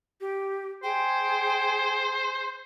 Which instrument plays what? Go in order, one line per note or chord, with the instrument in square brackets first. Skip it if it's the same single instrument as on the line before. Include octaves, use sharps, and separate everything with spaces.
[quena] G4
[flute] G#4 [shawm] C5 [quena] G5